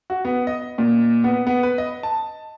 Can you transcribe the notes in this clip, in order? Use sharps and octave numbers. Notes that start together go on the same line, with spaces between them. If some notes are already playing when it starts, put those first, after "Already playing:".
F#4
B3
D#5
A#2
B3
B3
B4
D#5
A5